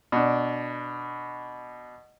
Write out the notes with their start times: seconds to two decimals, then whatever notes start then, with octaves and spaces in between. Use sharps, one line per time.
0.12 B2 D4